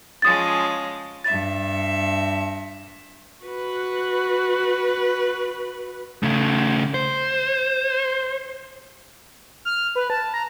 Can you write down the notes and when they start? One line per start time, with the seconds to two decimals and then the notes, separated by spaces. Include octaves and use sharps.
0.22 F3 G#3 C#4 D#6 A6
1.24 G2 E5 A6
3.45 F#4 B4
6.23 C#3 A3
6.94 C5
9.65 F6
9.95 B4
10.10 A5
10.34 A#5